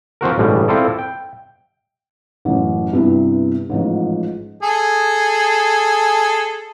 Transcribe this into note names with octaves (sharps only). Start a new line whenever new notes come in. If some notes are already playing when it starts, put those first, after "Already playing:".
F3 C4 F#4 A#4
A1 G2 B2 G3 G#3
C4 E4 F4 A4 D5
G5
A1 F#2
G2 C3 G3 B3 E4
A1 G#2 F3
G#4 A4